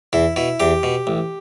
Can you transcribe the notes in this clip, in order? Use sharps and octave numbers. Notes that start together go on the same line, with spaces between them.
E2 E4
B2 E4
E2 G4
B2
A1